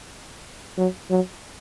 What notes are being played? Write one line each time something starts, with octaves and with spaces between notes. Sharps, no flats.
F#3
F#3